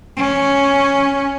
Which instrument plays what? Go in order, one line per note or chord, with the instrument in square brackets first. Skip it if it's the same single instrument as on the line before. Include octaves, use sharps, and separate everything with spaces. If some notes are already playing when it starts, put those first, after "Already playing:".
[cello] C#4